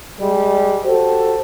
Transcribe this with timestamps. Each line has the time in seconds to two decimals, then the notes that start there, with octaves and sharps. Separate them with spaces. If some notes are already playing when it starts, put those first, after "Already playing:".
0.21 G3 G#3
0.85 F#4 G4 A4 C5